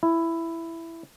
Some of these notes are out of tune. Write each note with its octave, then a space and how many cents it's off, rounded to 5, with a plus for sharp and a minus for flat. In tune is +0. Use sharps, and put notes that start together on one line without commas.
E4 +10